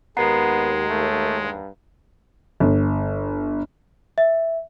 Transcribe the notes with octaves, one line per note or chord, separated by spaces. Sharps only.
D#2 G#3 B3 F#5 A#5 C7
A3
G2
G1
E5